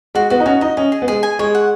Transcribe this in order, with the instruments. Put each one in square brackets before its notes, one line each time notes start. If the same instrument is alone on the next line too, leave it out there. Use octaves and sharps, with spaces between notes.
[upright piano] G#3 [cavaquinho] F#4
[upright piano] B3 [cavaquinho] F#4
[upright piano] D#4
[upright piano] C#4 [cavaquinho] F#4
[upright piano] D#4 [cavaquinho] D#5
[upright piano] C#4 [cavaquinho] D#5
[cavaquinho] G#4
[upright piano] B3
[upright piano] G#3 [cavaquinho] G#4
[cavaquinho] G#5
[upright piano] G#3 [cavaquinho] C#5
[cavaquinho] F#5